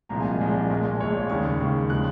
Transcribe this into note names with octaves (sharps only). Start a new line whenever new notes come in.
C2 A#2 F3 G#3 A#5
G#5
D#5
C2 A#2 F3 G#3
A#1 A#2 G#3
A#1 A#2 G#3 C#5
D#2 C#3 G#3 C#6
D#2 C#3 G#3
C#3 F3 G#3 F#6